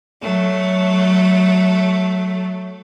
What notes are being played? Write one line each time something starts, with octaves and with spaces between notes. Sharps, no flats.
F#3 A3